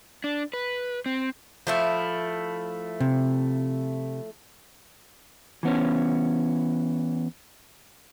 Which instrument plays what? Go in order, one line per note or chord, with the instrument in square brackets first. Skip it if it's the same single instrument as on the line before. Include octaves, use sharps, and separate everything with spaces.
[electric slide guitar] D4
B4
C4
[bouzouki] F3 A3 E4
[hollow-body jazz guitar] C3
[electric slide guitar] E3 B3 C#4